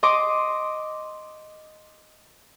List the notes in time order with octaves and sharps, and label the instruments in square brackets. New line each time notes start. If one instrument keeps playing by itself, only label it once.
[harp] D#5 C6 D6 D#6